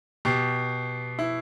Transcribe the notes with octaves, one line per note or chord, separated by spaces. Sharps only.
B2 G4
E4